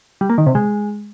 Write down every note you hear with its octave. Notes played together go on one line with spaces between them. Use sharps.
G3
A#3
D#3
C3
G#3